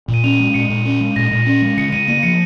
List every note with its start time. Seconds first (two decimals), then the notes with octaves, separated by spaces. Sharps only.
0.08 A#2
0.14 D#7
0.24 C#4 F7
0.34 D#7
0.40 G#3
0.54 A#2 C#7
0.70 A#2
0.85 C#4
1.00 G#3
1.16 A#2 A#6
1.31 A#2
1.46 C#4
1.62 G#3
1.77 C#3 C#7
1.92 C#3 D#7
2.08 A#3 D#7
2.23 F3 C#7